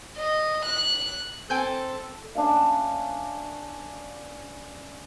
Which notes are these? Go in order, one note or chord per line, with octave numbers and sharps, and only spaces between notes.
D#5
F#6
C4 A4 G5 G#5 G6
C#4 D4 E5 F5